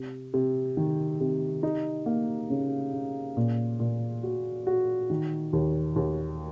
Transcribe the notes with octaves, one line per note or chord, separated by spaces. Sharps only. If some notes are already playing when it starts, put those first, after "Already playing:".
Already playing: C3
C3
D#3
C3
D#4
A#3
C#3
C#3
A#2
A#2
F#4
F#4
D#3
D#2
D#2